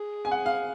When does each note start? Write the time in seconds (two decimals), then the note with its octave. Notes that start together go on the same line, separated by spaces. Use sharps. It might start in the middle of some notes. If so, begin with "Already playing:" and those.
Already playing: G#4
0.25 G#5
0.31 F#5
0.46 F5